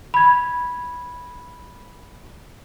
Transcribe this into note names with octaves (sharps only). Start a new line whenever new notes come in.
B5 G#6